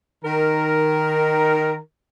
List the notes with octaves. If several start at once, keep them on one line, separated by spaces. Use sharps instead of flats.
D#3 A#4